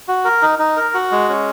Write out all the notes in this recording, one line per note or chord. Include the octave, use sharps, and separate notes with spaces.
F#4
A#4
D#4
D#4
A#4
F#4
G#3
C#4